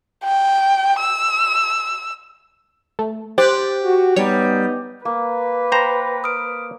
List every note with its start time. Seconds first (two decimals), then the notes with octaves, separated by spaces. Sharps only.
0.24 G5
1.00 E6
2.99 A3
3.38 G4 C5 F#6 A6
3.83 F#4
4.16 G3 B3 D#4 C#5 G6
5.05 A#3 B4
5.72 C5 G5 A#5 B5 A#6
6.24 D#6 F6 D7